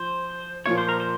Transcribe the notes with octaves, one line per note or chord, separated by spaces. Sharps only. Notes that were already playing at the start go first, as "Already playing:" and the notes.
Already playing: F3 C5
A#2 F3 A#3 F4 C#5
C5
A#4
C5